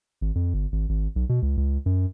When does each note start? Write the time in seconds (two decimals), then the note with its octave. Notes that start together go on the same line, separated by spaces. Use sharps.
0.21 G#1
0.35 F2
0.54 G1
0.72 G#1
0.89 G#1
1.16 B1
1.29 B2
1.42 C#2
1.57 C#2
1.86 F#2